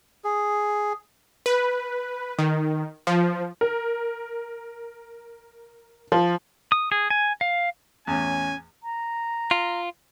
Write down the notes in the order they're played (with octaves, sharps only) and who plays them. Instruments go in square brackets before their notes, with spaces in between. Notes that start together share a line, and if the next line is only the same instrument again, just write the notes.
[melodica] G#4
[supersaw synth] B4
D#3
F3
[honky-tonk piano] A#4
F3
[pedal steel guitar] D#6
G#4
G#5
F5
[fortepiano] E2 A2 [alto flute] C#4 [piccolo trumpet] G#5
[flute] A#5
[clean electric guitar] F4